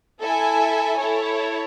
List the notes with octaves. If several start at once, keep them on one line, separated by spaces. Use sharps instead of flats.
E4 A4 E5 G#5
E4 A4 C#5